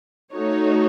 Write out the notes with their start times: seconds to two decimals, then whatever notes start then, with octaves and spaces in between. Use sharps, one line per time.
0.34 A3 D#4 F#4 C#5